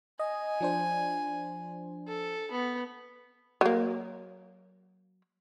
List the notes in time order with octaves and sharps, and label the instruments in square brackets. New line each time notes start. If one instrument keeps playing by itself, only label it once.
[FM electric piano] D#5 [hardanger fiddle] G#5
[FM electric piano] F3 D4 C5
[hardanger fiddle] A4
B3
[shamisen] F#3 A#3